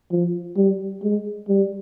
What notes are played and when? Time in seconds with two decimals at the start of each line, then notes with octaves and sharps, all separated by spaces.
0.12 F3
0.57 G3
1.03 G#3
1.48 G3